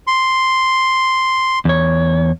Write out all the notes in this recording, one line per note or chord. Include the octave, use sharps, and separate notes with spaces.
C6
E2 C#5